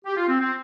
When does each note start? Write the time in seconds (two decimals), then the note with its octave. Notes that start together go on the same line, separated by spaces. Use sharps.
0.05 G4
0.17 F4
0.28 C4
0.39 C4